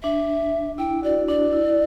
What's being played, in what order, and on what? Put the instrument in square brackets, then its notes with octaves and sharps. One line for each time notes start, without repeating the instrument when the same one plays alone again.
[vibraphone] D4 [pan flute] E5
[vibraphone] E4 [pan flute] G5
[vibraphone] F#4 [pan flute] D5
[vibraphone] D4 [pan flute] D5
[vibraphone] E4